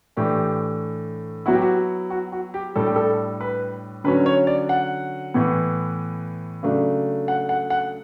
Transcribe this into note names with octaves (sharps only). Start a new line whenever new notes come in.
A2 E3 A3 D4 G4
F#3 B3 E4 F#4
G4
F#4
F#4
F#4
G4
A2 G3 D4 A4
G4
A4
B4
D3 F#3 C#4 B4
C#5
D5
F#5
A2 E3 B3
C#3 F#3 A3 D4
F#5
F#5
F#5